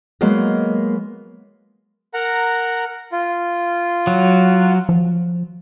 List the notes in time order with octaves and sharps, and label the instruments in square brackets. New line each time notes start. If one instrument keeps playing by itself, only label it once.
[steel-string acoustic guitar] F#3 G#3 A#3 B3 D#5
[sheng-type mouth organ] A#4 F#5 A#5
F4
[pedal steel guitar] F#3
[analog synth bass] F3